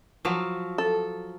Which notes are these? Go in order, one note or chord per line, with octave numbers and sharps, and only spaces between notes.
F3 F#3
A4